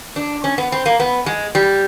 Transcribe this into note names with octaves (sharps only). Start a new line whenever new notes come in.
D4
C#4
B3
C4
A#3
B3
G#3
G3